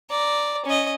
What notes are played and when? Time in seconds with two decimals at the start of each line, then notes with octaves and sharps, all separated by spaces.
0.10 D5 A#5
0.65 C#4 D#5